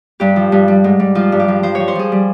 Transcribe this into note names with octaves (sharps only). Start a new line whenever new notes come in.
G2 G4
F3
G2
G3
G#2
G3
F3 F4
G2
G4
F3
F3 C5
C#5
F3
C5
F3 G#4
G3